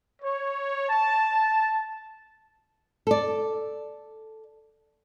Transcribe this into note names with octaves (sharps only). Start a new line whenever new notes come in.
C#5
A5
A4 D5